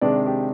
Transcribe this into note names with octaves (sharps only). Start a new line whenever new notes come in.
C3 D#3 G#3 D4 D5
G4